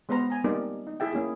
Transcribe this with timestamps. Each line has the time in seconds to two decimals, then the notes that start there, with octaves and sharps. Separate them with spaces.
0.09 G#3 B3 B4 C5 A#5
0.30 G#5 A#5
0.44 G3 A#3 C4 D#4 A#4 D5
0.87 D#4
1.00 E4 G#4 E5 G5
1.12 A#3 C#4 E4 G#4